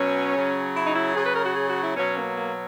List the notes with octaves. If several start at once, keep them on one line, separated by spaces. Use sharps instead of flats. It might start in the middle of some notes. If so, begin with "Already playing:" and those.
Already playing: B2 F#3 C#4
C#3 F#3
E4
D#4
E4
C#3 F#3 G#4
B4
A#4
F#4
G#4
F#4
E4
B2 F#3 C#4
A#3
A#3